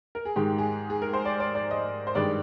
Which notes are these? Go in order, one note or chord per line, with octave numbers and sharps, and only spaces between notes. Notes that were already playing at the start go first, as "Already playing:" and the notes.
A#4
G#4
G#2 D#3 G#3 G4
G#4
G#4
A#4
C5
D5
D5
D5
D#5
C5
G2 D#3 G#3 D5